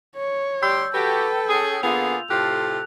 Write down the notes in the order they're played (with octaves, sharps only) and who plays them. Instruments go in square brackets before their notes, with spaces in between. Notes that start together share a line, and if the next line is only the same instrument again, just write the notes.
[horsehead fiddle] C#5
[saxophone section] D2 G3 G4 [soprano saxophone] C6 [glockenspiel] E6 G6
[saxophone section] F#4 G4 [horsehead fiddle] A4 G5 [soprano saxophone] B4
[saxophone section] C#4 G#4
[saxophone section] D3 A#3 G#4 [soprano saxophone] B3 [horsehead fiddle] F4 [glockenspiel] F7
[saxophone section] A2 C3 F4 [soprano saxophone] G4 [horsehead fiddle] A4 [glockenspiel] F#6